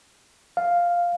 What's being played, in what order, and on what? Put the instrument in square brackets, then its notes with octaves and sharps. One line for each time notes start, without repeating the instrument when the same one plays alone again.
[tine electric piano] F5